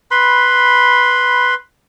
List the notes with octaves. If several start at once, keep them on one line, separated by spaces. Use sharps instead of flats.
B4 B5 C6